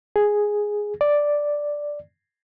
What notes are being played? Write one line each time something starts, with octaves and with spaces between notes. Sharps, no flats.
G#4
D5